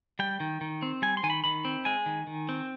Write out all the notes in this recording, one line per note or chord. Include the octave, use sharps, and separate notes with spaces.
G3 G5
D#3
D#3
C4
G3 G#5
C6
D#3 G#5
B5
D#3 B5
C4
G#3 G#5
D#3
D#3
C4